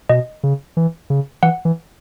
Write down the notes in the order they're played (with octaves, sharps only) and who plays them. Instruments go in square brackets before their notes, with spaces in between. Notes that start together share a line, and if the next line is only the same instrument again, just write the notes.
[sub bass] B2 [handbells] D#5
[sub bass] C#3
E3
C#3
[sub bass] E3 [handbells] F#5
[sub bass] E3